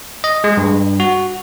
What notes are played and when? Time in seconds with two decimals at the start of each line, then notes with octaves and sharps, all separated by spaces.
0.24 D#5
0.44 G#3
0.57 G2
1.00 F#4